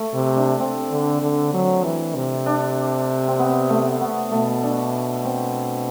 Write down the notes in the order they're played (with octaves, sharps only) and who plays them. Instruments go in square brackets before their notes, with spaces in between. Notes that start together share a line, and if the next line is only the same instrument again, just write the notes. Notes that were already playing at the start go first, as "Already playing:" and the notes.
Already playing: [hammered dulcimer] A3
[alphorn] C3
[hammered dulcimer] D4
C4
[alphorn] D3
D3
F#3
E3
C3
[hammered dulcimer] D4
C4
B3
A3
B3
[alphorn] B2 [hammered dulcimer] A3
[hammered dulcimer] D4
C4